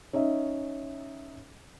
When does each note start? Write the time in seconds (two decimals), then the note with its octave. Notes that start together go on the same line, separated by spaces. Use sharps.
0.13 C#4 D#4 D#5 E5